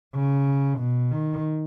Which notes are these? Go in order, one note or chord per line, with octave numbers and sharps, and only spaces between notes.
C#3
B2
D#3